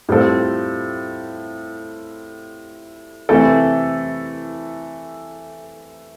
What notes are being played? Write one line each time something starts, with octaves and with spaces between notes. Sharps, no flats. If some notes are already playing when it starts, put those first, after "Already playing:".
A2 G3 C4 F4 A4
C3 E3 A3 E4 A4